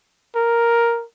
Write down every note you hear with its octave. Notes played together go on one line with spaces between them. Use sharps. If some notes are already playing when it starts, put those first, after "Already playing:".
A#4